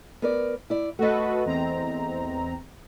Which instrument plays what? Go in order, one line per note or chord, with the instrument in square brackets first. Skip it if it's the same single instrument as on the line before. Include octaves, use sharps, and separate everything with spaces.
[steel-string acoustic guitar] B3 A#4 D5
E4 D5
[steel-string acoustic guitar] A3 D#5 [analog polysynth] F#4 A4 B4
[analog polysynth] E2 C4 A#5